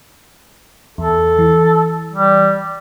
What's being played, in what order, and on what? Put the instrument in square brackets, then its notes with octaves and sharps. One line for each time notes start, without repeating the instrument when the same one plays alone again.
[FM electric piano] E2 [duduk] A4
[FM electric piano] E3
[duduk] G3